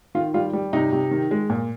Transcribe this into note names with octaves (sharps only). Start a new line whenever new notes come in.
D#3 F4
G3 F4
G3
C3 D#4
C3
D#3
G#3
A#2